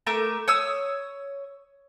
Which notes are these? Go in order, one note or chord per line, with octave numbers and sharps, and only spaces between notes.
A3 A#4 E5 D6
C#5 D#6 E6